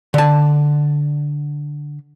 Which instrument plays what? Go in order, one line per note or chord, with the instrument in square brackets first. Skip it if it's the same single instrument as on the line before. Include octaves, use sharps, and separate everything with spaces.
[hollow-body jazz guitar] D3 A5